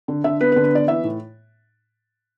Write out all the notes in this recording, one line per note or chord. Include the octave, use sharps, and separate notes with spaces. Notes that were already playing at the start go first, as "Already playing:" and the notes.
D3
D3 E5
B3 B4
B4
D3
B4
B3 D5
E3 E5
A2